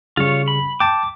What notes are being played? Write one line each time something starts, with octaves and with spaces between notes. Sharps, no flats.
C#3 G3 F4 C#5
B5
G5 A5 D6